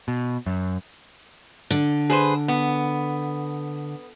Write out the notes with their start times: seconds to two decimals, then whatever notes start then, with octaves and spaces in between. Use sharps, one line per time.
0.08 B2
0.46 F#2
1.70 D3
2.10 G#4 B4 C5
2.48 B3